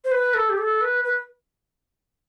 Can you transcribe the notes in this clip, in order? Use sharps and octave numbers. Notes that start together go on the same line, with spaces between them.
C5
B4
A4
G4
A4
B4
B4